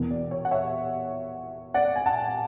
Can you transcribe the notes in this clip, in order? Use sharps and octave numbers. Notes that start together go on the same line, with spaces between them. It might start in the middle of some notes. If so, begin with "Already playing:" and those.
Already playing: E1 E2 B2
D5
C#5
F#5
C#5 E5
D5 F#5
G#5
F#5 A5